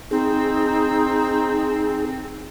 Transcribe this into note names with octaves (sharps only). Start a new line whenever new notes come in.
C4 D#4 G#4